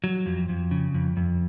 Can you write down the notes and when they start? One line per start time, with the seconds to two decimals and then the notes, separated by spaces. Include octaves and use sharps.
0.04 F#3
0.26 F2
0.49 F2
0.71 C#3
0.94 F2
1.17 F2